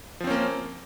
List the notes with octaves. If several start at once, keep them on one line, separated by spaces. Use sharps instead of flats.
F3 A#3 C4 C#4